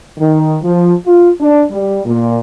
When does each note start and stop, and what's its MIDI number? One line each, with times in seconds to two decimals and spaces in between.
0.18 0.57 51
0.63 0.92 53
1.07 1.29 65
1.40 1.63 62
1.70 2.00 55
2.05 2.38 46